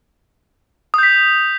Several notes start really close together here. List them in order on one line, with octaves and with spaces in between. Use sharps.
D#6 G6 B6